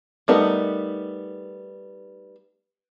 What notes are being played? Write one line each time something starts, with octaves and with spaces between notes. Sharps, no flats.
G3 A3 B3 D#4 A#4